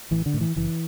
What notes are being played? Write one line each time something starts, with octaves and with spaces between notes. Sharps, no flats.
A1 E3
D3
A2
E3
F#1 E3